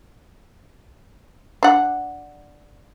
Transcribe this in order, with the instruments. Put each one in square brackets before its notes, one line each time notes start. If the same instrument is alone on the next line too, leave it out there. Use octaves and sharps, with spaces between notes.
[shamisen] D4 F#5